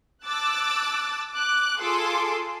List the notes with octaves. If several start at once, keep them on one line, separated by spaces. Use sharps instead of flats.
A5 D6 E6 F#6 A6
D6 F#6
F4 G#4 A4 G#5 C6 D6